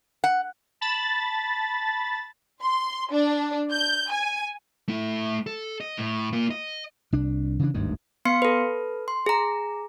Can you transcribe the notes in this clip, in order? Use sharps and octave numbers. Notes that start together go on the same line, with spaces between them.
F#5
A5 B5 A6
C6
D4
G6
G#5
A3 E4
A4
D#5
A2
A#3 F4
D#5
C2 D4
C#3 E3 D4
G1 D2 G#2 D#3
B3 F5 C6 C#7
A4 B4
C6
G#4 A#5